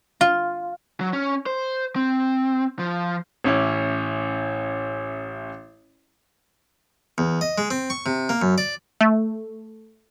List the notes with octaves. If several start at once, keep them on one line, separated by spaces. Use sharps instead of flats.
F4
F#3
C#4
C5
C4
F3
A1 C#4 E4 D6
E2
D#5
G#3
C4
C#6
C3
A#3
F#2
D5
A3